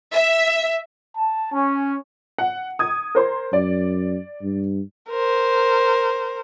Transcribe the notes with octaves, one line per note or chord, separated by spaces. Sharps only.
E5
A5
C#4
F#5
D#6 G#6
A#4 C5 C6
F#2 D5
G2
A#4 C5